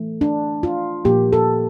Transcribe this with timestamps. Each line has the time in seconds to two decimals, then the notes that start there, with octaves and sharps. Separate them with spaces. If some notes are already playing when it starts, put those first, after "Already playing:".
Already playing: E3 A3
0.21 D4
0.63 F4
1.05 A#2 F3 A#3 G4
1.33 A4